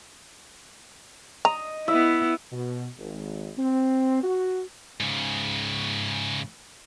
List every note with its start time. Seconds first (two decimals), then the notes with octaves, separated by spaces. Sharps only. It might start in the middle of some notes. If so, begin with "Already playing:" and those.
1.45 D#5 A#5
1.88 B3 E4 E5
2.51 B2
2.98 G#1
3.57 C4
4.23 F#4
5.00 G#2 C#3